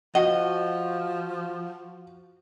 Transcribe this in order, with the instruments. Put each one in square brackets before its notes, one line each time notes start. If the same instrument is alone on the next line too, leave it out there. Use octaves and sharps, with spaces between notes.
[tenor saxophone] F3 [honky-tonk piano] F#4 [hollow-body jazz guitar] D#5